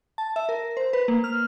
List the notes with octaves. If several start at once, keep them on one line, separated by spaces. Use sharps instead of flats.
A5
E5
A#4
C5
B4
A#3
F6